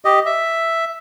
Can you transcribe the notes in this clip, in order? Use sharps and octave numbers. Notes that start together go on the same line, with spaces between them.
G4 D#5
E5